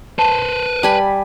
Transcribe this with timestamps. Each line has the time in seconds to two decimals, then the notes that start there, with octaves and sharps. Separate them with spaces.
0.19 B4 C5 A5
0.83 G3 G#5 A5 B5